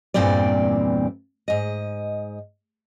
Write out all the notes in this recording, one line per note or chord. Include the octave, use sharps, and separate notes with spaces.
E2 G2 A#2 E3 C4 D5
G#2 D#5